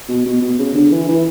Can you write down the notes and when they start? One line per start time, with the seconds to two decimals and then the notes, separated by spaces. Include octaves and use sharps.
0.08 B2
0.25 B2
0.41 B2
0.59 C#3
0.75 D3
0.91 E3
1.08 E3